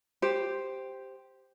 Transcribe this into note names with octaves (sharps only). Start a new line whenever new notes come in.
G4 C5